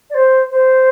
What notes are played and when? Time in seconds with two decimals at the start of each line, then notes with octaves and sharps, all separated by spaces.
0.10 D5
0.14 C5
0.51 C5